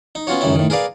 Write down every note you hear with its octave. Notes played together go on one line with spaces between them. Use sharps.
D#4
B3 C#4 F4 F#4 C#5
C#2 F#2 D#3 C#4 E4
A2 D#3
G#4 A#4 B4 D5 F5